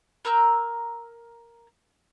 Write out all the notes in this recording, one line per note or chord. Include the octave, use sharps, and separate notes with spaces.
A#4 A#5 E6 G6